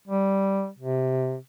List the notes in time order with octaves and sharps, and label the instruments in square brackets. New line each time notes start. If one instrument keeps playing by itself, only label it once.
[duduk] G3
C3